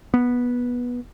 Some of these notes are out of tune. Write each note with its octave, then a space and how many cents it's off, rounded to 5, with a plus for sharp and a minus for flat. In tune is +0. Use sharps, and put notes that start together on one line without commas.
B3 -15